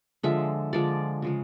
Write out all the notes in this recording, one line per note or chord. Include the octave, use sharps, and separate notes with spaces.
D3 F3 G#3 E5
D3 F3 G#3 D5
C#3 F3 G#3